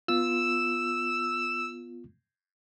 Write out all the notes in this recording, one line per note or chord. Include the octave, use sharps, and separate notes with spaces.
B3 F4 E6